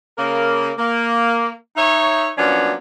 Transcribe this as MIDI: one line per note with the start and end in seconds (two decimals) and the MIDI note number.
0.18 0.71 49
0.18 0.71 58
0.18 0.71 70
0.78 1.52 58
1.76 2.29 63
1.76 2.29 73
1.76 2.29 76
2.37 2.73 53
2.37 2.73 54
2.37 2.73 58
2.37 2.73 59
2.37 2.73 61
2.37 2.73 62